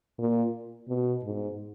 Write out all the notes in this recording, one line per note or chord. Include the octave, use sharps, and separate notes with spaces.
A#2
B2
G#2